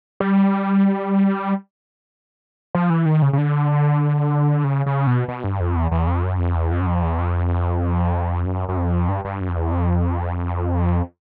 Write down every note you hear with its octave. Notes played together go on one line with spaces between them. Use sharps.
G3
F3
E3
D#3
C#3
C#3
D3
C#3
C#3
B2
B2
G2
F2
E2
E2
F2
F#2
F2
E2
F2
F#2
F2
E2
F2
F#2
F#2
F2
G2
G2
F#2
F2
E2
F2